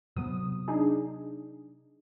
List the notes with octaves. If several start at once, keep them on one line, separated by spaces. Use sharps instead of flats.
C3 F#3 B3 D#6
D4 D#4 G#4